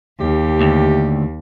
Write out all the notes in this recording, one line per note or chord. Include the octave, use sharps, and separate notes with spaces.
D#2 G4
D2